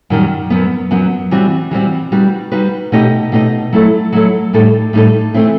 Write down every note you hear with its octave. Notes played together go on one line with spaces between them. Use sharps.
F#2 D#3 G3
F#2 F#3 B3
F#2 F#3 B3
E3 G3 C4 F#4
E3 G3 C4 F#4
G3 D#4 F#4 B4
G3 D#4 F#4 B4
B2 A3 D#4 G4 D#5
B2 A3 D#4 G4 D#5
F#3 A3 E4 A4
F#3 A3 E4 A4
A2 G3 D#4 A4
A2 G3 D#4 A4
E3 A3 C4 E4